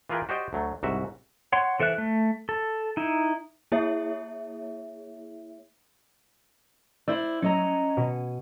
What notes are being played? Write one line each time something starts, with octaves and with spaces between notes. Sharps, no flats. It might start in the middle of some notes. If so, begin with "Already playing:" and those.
E3 F4 G#4 A#4 B4 G5
F#4 G4 C5 D5 D#5 G5
D2 F#3 A3
C2 G#2 F#4 E5
C#5 F#5 C6
E3 A4 C5 E5 F#6
A3
A4
D#4 E4
A#3 E4 G#4 C#5 E5
E4 C5 D5 E6
F#3 C#4 D#5 A#5
B2